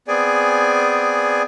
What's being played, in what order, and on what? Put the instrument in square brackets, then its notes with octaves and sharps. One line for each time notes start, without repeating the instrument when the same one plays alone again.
[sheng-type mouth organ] B3 C4 G#4 D5 G#5